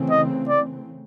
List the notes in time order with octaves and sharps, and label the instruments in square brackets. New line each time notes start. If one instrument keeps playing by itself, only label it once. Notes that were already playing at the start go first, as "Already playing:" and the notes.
Already playing: [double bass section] C#3 E3 A3 C4
[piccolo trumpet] D#5
D5